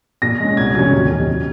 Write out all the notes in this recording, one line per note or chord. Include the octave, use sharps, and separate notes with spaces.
A#2 A#6
G#3 C#4
C2 G#6
A#2 F#3 C#4 G#6
D#2
D#3 F#3 C#4
F2